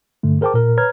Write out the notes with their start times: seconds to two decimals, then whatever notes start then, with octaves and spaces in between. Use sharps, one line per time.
0.23 G2 D3 A3
0.41 G#4 A#4 C5 G5 A5 D6
0.54 A#2 A#4
0.78 B4 C#5 A#5 F6 G#6